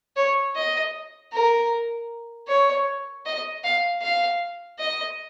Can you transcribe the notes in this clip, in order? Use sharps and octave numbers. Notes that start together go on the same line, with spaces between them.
C#5
D#5
A#4
C#5
D#5
F5
F5
D#5